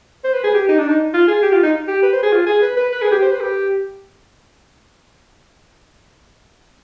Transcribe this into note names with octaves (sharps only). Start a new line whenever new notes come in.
C5
B4
G#4
G4
D#4
D4
D#4
F4
G#4
G4
F4
D#4
G4
B4
C5
G#4
F4
G#4
B4
B4
B4
G#4
G4
C5
B4
G4